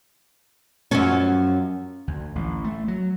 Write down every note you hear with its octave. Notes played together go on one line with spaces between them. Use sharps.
F#2 F3 C#4
D2
A1
A3
F#3